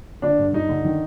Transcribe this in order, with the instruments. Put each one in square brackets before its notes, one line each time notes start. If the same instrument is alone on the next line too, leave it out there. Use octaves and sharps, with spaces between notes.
[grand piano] D3 D4
G2
G2 D#4
D3
D#3